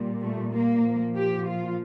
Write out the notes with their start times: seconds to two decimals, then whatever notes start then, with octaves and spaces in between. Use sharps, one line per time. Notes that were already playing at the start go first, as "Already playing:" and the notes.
Already playing: A#2 G3
0.21 A3
0.53 A#3
0.84 A#2 F3
1.15 G4
1.46 F4